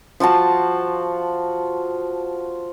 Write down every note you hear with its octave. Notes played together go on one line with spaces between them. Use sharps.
F3 F4 F#4 A5